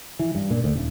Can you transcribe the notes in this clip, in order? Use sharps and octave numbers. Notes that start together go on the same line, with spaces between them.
E3
G2
A#2
D2
D#1